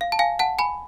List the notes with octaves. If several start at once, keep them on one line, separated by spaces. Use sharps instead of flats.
F5
A5
F5 G#5
F#5 A5
G#5 B5